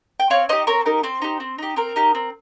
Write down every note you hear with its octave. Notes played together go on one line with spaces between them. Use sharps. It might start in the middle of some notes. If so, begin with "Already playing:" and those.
G5
C4 C#5 F5
D#4 G4 C5 D#5
C4 A#4 C#5
D#4 G4 A#4
C4 C5
D#4 G4
C4
D#4 G4
C4 A#4
D#4 G4
C4